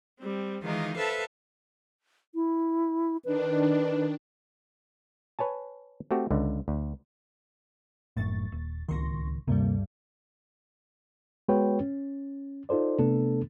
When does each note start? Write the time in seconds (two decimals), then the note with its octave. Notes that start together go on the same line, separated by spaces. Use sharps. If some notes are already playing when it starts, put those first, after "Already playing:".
0.20 G3 C4
0.63 D#3 E3 G#3 D#4 F4 A#4
0.97 A4 B4 C5 E5 F5 A5
2.35 E4
3.25 D#3 D4 B4
5.39 B4 C#5 G#5 A5
6.11 A3 C4 F#4 G4
6.31 C#2 D3
6.68 D2
8.17 F#1 F#2 A2 C#6 A6
8.52 D#1
8.88 D1 C#2 D#3 C6 C#6 A#6
9.47 D2 G2 C3 G3 A#3
11.48 G#3 B3 F#4 B4 C#5 G5
11.81 C#4
12.69 D#4 F4 A4 C5 D5
12.99 C3 A3 B3 D4 A4